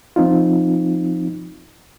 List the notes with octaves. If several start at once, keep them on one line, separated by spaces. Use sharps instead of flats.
F3 C4 D#4 F4